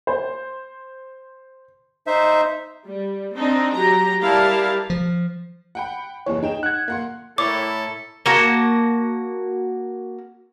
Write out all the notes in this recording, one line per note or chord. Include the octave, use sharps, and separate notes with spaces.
C5
D#4 C5 E5
G3
C4 D4 D#4
F#3 G4 A#5
G3 E4 G4 A#4 F5 A5
F3
F#5 G5 B5
F#1 D#2 E3 C#5
D#4 G#4 G5 E7
F#5 F#6 G#6
A#3 F#5 C6
A2 E4 A4 A#4 C#5 D6
A#3 F#4 F#5 A5